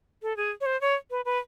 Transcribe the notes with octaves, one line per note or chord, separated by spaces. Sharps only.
A4
G#4
C#5
C5
C#5
B4
B4